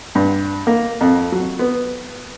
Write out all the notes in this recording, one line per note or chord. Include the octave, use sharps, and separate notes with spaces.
G2
A#3
F2
F#3
B3